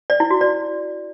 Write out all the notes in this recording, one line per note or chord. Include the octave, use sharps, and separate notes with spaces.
D5
E4
F#4
D5